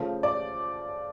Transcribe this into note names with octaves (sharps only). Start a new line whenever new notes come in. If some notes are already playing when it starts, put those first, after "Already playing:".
Already playing: C#3 F3 A3
D5